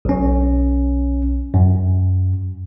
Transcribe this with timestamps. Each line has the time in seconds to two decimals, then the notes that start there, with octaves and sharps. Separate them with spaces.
0.05 B1 C#4
1.54 F#2